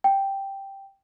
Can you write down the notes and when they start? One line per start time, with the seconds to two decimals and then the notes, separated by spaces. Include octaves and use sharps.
0.04 G5